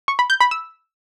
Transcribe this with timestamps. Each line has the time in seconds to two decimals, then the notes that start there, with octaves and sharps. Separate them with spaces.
0.08 C#6
0.19 B5
0.30 G6
0.41 B5
0.51 E6